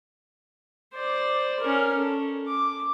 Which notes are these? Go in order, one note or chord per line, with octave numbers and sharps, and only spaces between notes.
C5 D5
C#4 A#4
A4
D6